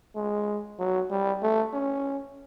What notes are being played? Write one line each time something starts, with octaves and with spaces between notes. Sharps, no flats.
G#3
F#3
G3
A3
C#4